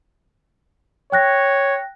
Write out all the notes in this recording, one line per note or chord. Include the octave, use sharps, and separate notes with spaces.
C#5 G5 F#6 A#6